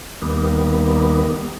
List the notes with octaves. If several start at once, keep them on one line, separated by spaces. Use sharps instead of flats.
D#2 D#3 G3 A#3 B3